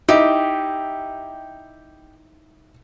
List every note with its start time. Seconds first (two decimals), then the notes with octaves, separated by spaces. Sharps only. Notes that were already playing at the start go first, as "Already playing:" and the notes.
0.09 D#4 E4 G4